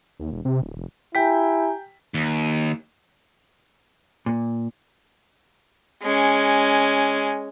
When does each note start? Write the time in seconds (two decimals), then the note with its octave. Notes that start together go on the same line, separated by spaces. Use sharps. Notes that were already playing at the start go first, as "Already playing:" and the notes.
0.20 D#2
0.32 E1
0.45 C3
0.62 D1
0.77 F1
1.15 E4 G4 G5 G#5 A#5 B6
2.14 D#2
4.26 A#2
6.02 G#3 C#4